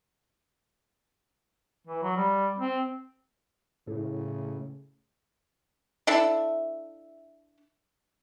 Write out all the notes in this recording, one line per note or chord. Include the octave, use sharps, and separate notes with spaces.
E3
F#3
G3
C4
A2 C#3
D4 E4 A4 E5